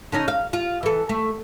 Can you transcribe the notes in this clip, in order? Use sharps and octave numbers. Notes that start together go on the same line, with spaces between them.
D3 C#4 D#4
F5
F4
E3 A4
A3